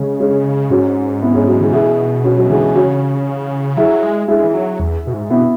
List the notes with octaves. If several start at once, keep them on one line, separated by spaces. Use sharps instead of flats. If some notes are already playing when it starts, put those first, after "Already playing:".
Already playing: C#3 G#3 C#4
G#3 C#4
G#2 C#4 F#4
B3 E4
G#3 C#4
F#3
E3 G#3
B2 E4 G#4
C#4 F#4
F#3
E3 G#3
C#3 C#4 F#4
F#3 E4 G#4
G#3
G#3 E4 G#4
E3
F#3
E2
B2
G#2
B2 B3 E4